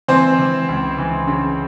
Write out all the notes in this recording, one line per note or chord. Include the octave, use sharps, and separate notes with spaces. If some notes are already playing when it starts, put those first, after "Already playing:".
E3 C4 C5
E3
C#2
E3
C#3